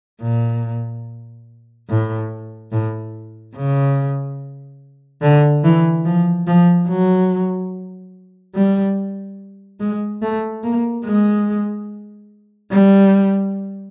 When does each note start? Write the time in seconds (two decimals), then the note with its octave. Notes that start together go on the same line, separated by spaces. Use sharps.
0.22 A#2
1.89 A2
2.72 A2
3.56 C#3
5.22 D3
5.64 E3
6.05 F3
6.47 F3
6.88 F#3
8.55 G3
9.80 G#3
10.22 A3
10.64 A#3
11.05 G#3
12.72 G3